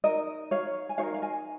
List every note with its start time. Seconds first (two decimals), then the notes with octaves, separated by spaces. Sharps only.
0.04 D#4 A#4 D#5
0.51 C#5 F5
0.89 G#5
0.98 D#4 C#5 F5
1.03 A#4
1.14 F5
1.22 D#5 G#5